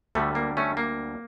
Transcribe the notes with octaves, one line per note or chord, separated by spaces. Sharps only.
D2 D3 G3 A3
A#3
A3 C#4
A#3